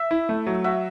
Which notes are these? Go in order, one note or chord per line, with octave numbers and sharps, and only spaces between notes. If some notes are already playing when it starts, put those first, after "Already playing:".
Already playing: E5
E4
A3
F#3
F#4 E5